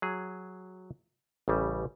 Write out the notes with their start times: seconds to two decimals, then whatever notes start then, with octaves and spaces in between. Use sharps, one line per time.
0.02 F#3 G#4
1.48 A1 C#3 G3